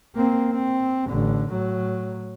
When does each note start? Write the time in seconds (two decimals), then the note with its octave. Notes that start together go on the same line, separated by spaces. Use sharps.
0.15 A#3 C4
0.51 C4
1.10 A1 D3
1.51 A2 F#3